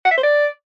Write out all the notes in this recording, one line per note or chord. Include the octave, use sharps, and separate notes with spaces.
F#5
E5
C5
D5